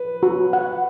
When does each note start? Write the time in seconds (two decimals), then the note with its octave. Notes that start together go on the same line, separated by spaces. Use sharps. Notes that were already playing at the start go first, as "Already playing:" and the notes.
Already playing: B4
0.23 F#4
0.53 F#5